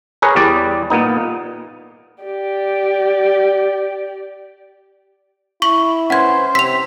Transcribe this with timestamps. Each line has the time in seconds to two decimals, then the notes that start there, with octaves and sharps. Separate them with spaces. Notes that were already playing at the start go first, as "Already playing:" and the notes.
0.22 G#4 A#4 B4 C#5
0.36 E2 G3 D5
0.90 A#2 B3 D#4
2.24 G4 D5
5.62 E4 C#6 F#7
6.10 C#4 B4 C5 F#5 G#6
6.55 C3 E6 B6 F7